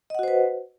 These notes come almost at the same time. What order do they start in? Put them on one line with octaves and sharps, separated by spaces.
D#5 F#5 F#4 C5 B4